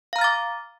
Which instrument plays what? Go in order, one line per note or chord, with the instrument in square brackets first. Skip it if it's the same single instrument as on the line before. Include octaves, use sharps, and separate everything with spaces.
[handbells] F5
A#5
F6
A6
D6